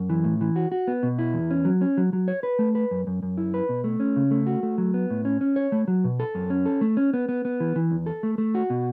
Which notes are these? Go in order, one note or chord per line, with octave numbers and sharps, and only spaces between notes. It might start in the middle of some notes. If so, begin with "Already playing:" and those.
Already playing: F#2
E3
A2
E3
F#4
F#4
B3
B2
E4
E2
C#4
F#3
C#4
F#3
F#3
C#5
B4
A3
B4
F#2
F#2
F#2
E4
B4
B2
A3
C#4
C#3
A3
F#4
A3
F#3
B3
A2
C#4
C#4
C#5
A3
F#3
B2
A4
F#2
C#4
A4
A3
C#4
B3
B3
B3
E3
E3
E2
A4
A3
A3
F#4
B2